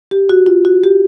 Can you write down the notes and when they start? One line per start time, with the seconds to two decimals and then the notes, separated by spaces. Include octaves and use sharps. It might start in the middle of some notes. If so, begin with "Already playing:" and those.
0.11 G4
0.29 F#4
0.46 F4
0.65 F#4
0.84 G4